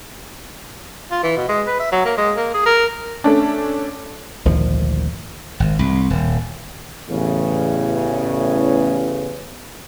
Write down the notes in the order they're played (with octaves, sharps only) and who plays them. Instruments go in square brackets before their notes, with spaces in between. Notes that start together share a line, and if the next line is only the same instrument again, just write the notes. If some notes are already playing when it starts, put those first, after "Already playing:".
[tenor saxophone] F4
E3
B2
G#3
B4
E5
F#3
A#3
G#3
A#3
G#4
A#4
[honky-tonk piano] A3 C#4 D4
[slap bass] G#1 D2 A#2 F3
G#1
C2
D#1
[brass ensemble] A1 E2 A2 C#3